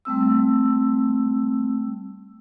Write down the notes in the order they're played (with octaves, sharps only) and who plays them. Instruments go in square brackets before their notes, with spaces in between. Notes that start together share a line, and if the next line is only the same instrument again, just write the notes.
[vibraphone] G3 A3 C4 E6